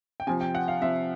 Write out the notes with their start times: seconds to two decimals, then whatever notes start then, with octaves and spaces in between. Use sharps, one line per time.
0.20 G5
0.27 C3 F3 G#5
0.41 G5
0.55 F#5
0.68 F5
0.81 C3 F3 E5